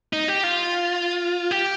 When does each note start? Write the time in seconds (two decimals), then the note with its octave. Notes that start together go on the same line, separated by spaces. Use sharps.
0.13 D#4
0.28 G4
0.43 F4
1.51 G4